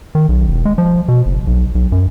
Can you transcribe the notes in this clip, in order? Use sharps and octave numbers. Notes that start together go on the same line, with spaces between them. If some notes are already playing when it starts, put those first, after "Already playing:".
D#3
B1
E1
G#3
F3
B2
F#1
B1
B1
F#2